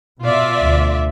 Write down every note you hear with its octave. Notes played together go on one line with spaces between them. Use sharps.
B2 F4 D5 E5
D2